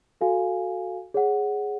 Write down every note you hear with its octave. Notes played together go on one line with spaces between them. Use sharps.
F#4 A4 F5 G#5
G#4 C#5 F#5